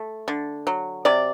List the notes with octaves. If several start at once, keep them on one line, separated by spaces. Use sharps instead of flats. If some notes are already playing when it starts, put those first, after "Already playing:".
Already playing: A3
D3
F#3
C3 D5